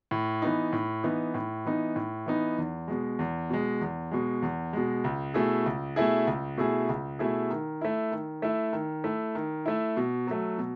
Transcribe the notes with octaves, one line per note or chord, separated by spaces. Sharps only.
A2
E3 B3 D#4
A2
E3 B3 D#4
A2
E3 B3 D#4
A2
E3 B3 D#4
E2
B2 G#3
E2
B2 G#3
E2
B2 G#3
E2
B2 G#3
C#2
B2 A3 E4 G#4
C#2
B2 A3 E4 G#4
C#2
B2 A3 E4 G#4
C#2
B2 A3 E4 G#4
D#3
A3 E4
D#3
A3 E4
D#3
A3 E4
D#3
A3 E4
B2
F#3 A3
B2